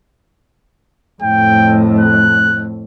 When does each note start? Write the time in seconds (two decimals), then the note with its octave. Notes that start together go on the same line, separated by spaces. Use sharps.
1.22 F2 A2 G5
2.00 F#6